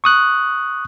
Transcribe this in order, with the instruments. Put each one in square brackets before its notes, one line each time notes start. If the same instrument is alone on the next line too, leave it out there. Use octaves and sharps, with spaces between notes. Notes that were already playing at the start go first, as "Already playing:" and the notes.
[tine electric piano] C#6 D#6 F#6